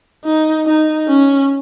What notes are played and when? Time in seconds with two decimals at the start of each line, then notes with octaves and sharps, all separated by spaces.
0.25 D#4
0.67 D#4
1.08 C#4